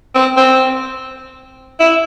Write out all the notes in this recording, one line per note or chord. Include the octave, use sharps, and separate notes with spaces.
C4
C4
E4